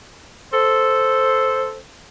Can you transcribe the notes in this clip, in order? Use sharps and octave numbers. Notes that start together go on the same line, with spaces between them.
A4 C5